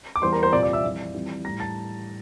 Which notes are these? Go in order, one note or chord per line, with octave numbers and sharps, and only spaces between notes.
D6
E2 E3 G3 C5 C6
A#4 A#5
C5 C6
C2 A#2 G3 D5 D6
D5 D6
E5 E6
F2 E3 G3
F2 E3 G3
A2 G3 A#5 A#6
A5 A6